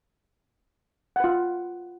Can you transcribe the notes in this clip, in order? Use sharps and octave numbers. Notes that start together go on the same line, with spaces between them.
F4 B4 F#5